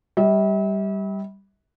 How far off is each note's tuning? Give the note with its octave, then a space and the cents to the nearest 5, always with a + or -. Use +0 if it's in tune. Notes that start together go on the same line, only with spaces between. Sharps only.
G3 +0 E5 -40